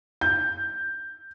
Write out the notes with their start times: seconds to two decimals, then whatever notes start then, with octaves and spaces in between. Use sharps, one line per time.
0.21 G6